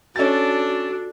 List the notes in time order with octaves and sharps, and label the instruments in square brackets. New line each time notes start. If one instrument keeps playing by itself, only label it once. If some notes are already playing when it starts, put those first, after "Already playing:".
[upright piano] C#4 A6 [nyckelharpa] D4 A4 [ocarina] F#4